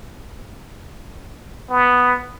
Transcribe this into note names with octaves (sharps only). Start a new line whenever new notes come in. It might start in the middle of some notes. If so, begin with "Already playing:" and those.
B3